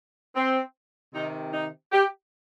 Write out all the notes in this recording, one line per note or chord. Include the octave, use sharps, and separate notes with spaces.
C4
C3 D#3 D#4
D#4
G4